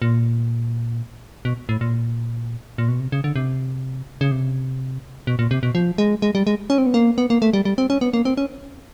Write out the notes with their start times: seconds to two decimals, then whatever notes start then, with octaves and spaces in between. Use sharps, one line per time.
0.02 A#2
1.45 B2
1.69 A2
1.81 A#2
2.78 A#2
2.88 B2
3.00 C3
3.12 C#3
3.24 D3
3.36 C3
4.21 C#3
4.31 C3
5.27 B2
5.39 A#2
5.51 C3
5.63 B2
5.75 F3
5.98 G#3
6.22 G#3
6.35 G3
6.47 G#3
6.70 C#4
6.78 C4
6.86 B3
6.94 A#3
7.18 B3
7.30 A#3
7.42 A3
7.53 G3
7.65 G3
7.78 C4
7.90 C#4
8.01 B3
8.13 A#3
8.25 C4
8.37 C#4